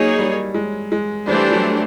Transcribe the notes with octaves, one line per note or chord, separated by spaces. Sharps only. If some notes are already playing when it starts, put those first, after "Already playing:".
Already playing: F#3 A#3 D#4 G#4 C#5
G3
G#3
G#3
E3 G3 A3 D4 G4 C5
F#3